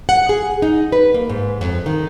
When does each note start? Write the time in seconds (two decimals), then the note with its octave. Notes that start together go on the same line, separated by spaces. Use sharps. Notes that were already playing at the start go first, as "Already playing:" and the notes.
0.09 F#5
0.29 G#4
0.62 D#4
0.92 B4
1.14 A#3
1.29 G#2
1.61 F2
1.86 D#3